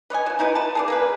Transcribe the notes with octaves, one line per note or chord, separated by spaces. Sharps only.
B4 C#5 D#5 G#5
F3 F#3
D#4 E4 F#4 B4
B4 A5
G#4 A#4 D5
A#3 G#4 B4